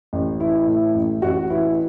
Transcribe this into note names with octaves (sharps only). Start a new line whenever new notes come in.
A1
E3 E4
A2
A1
A1 F#4
E3 E4